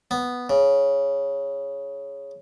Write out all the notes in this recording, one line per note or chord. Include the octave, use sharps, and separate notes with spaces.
B3
C#3